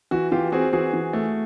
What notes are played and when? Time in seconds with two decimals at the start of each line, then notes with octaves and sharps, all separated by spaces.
0.11 E3 F#4
0.32 E3 F4 G4
0.52 C4 F#4 G#4
0.73 E3 F#4 G#4
0.93 E3
1.13 A3